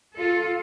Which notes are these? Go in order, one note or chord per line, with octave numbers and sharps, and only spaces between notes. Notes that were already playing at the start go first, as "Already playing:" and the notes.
F4 A4